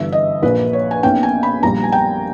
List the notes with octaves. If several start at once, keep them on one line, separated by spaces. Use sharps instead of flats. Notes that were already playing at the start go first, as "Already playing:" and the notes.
Already playing: G1 G2 E3 E5
D#5
A#1 A#2 A#3 B4
C#5
G#5
B1 B2 A#3 C#4 G5
G#5
B5
A#1 A#2 G3 A#5
G#5
G5